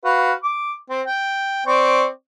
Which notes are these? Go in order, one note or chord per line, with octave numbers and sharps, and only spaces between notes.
F#4 B4 F5
D6
C4
G5
C4 D5 C#6